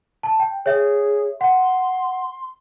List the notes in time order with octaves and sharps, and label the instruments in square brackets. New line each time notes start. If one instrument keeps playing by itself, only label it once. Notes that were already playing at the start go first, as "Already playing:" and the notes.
[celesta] A5
G5
[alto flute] G#4 [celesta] C#5 E5
[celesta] F#5 [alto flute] C6